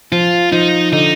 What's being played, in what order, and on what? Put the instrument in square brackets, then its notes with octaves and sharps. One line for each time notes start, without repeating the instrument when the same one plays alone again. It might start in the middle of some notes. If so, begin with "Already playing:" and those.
[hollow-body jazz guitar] F3 [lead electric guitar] F4
[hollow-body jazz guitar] F3 [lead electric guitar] D#4
[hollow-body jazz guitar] D3 [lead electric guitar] D#4